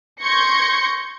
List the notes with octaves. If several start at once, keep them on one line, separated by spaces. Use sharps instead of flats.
C6 C#6 G6 G#6 A#6 C#7